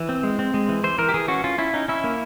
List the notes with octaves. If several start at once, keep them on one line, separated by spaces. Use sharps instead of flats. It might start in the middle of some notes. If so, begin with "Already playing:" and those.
Already playing: E3
C4
G#3
C4
G#3
E3
E3 C5
E3 A#4
G4
E3 G#4
C#4 F#4
C#4 F4
C#4 E4
C#4 D#4
C#4 E4
A#3